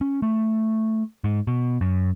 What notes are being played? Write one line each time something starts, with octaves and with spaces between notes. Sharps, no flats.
C#4
A3
G#2
B2
F#2